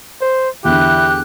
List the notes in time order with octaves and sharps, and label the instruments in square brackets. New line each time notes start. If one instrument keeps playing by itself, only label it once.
[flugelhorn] C5
[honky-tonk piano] E2 D3 [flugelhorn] E4 [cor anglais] G4 [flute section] F#6